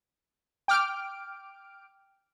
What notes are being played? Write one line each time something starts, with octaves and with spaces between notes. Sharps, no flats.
G5 D6 F6 D7